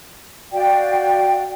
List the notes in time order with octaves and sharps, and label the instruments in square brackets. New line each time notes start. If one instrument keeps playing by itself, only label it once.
[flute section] F#4 D5 F5 G5